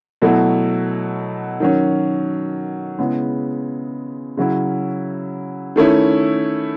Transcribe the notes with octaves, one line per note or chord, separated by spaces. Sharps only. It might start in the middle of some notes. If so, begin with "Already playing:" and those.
B2 F#3 A3 E4
D#3 F#3 C#4
C#3 G#3 B3 E4
C#3 F#3 C#4 E4
D#3 A3 C#4 E4